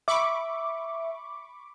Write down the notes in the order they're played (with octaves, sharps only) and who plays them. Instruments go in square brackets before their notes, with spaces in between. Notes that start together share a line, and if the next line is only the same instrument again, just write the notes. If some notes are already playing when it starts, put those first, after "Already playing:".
[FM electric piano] E5 [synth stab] B5 C#6 D6